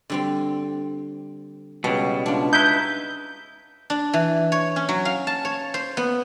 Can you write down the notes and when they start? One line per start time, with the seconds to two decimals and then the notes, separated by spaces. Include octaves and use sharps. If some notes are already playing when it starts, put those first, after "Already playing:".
0.10 D3 G3 C4
1.84 C#2 B2 G3
2.26 D4 F4
2.53 D#4 E4 B4 G6
3.90 D4
4.13 E3
4.52 C#5
4.76 C#4
4.89 F#3
5.05 F5
5.27 A5
5.45 C#5
5.74 C5
5.97 B3